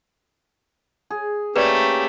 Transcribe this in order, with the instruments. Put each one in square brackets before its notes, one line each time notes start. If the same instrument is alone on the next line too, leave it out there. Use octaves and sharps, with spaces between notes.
[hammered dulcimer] G#4
[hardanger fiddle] A3 [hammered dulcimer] A#3 [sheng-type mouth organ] C#4 G4 [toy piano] B4 D5